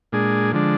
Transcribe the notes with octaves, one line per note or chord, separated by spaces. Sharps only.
A#2 G#3 D4 G#4
D3 F3 G#3 D4